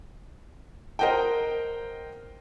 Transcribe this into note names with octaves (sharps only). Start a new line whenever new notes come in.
A#4 C5 D#5 F#5 G5